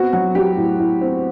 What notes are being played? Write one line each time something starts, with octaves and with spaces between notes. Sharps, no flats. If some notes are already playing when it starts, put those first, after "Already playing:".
Already playing: B3 C4 F#4
F#3 F#4
F#3 G4
A2
A2
C4